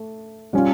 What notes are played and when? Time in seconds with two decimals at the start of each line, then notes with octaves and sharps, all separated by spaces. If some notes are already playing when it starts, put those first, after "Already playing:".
Already playing: A3
0.53 G3 C#4 F4